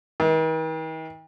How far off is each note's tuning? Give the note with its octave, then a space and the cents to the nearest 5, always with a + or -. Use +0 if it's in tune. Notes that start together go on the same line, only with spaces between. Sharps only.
D#3 +45